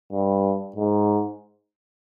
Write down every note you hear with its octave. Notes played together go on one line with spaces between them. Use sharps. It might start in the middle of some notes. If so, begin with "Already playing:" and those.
G2
G#2